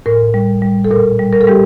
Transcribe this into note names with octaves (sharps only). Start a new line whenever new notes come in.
A2 A#4
G3
G3
A4
A#2 A#4
G3
A#4
A4
G3 G4